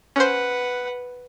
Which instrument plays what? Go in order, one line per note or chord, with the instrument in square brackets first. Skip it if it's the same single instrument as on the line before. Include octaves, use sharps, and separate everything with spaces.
[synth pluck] C#4 C5 [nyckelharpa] B4 F#5